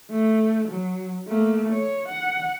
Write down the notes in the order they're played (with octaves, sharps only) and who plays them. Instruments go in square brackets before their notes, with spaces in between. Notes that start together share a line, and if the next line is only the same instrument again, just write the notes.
[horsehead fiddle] A3
F#3
A3 A#3
C#5
F#5